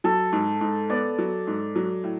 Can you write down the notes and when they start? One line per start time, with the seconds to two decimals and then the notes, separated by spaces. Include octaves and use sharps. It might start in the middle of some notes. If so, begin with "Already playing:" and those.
0.04 F#3 A4
0.33 G#2
0.61 G#2
0.90 B3 D5
1.18 F#3
1.47 G#2
1.76 F#3
2.04 A2